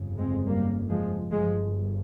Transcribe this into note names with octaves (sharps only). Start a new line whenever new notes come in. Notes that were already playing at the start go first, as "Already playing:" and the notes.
Already playing: G1 F2 C#3
G#3 C4
G3 A#3
F3 G#3
G1 G2 F3 G#3